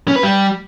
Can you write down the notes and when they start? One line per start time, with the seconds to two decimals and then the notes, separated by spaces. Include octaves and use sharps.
0.08 C#4
0.16 B4
0.23 G3